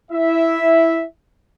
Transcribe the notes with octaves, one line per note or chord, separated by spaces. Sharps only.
E4 E5